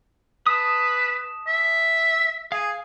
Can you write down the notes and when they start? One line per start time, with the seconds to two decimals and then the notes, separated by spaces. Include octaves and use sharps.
0.46 B4 A5 D#6
1.47 E5
2.52 G#4 F5 G#5